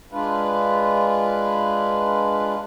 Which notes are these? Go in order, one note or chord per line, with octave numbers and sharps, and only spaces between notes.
G#3 D4 F4 B4